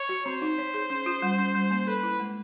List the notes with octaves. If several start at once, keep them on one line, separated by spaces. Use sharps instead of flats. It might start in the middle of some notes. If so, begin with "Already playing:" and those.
Already playing: C#5
F#4
C4 C5
D#4
C#5
G#4
C#4
F4
G3
C#4
G3
A#3
A4 B4
E4
G#3